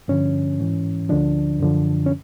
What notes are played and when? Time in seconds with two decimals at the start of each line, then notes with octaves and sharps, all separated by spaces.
0.08 G2 D3 F3 C#4
0.60 G#2 E3
1.09 D2 D3 F3 D4
1.60 F#2 D3 F3
2.06 C#4